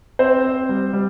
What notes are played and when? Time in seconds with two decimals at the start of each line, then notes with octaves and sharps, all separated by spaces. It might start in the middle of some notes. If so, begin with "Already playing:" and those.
0.19 C4 C5
0.44 C4
0.69 G3
0.93 G3